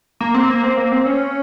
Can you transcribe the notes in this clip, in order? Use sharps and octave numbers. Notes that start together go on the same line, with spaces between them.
A#3
C4
A#3
C4
A#3
C4
C#4